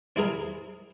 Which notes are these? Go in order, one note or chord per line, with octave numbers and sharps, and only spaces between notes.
C4 E4 G#4 A#4